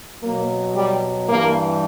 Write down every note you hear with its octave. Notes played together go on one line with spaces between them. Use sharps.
B2 F#3 A#3
G3
G2 E3 G3 A#3